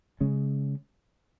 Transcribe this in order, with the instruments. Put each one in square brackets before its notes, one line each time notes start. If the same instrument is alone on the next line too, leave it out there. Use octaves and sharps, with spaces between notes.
[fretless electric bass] C#3 G#3 C#4